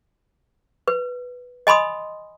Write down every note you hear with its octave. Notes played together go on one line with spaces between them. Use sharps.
B4
D#5 G#5 B5 C6 D#6